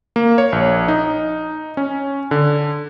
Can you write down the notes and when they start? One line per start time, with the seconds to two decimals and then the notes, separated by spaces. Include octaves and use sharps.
0.16 A#3
0.38 C#5
0.53 A#1
0.88 D#4
1.77 C#4
2.31 D3